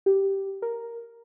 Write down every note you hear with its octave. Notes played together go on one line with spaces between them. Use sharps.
G4
A#4